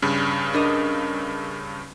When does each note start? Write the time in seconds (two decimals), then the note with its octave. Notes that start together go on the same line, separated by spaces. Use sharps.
0.02 G2 C#3
0.54 D4 A#4 D#5